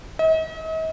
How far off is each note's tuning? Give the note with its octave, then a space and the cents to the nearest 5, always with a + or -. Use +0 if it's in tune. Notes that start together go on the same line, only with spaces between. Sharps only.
D#5 +45